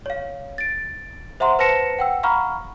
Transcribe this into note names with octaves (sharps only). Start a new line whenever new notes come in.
C#5 F5
A6 D7
C5 E5 F#5 A#5 C6
B4 C5 A5 A#6 C#7 E7
F#5 G5 E6
F5 F#5 A#5 B5 C#6 F6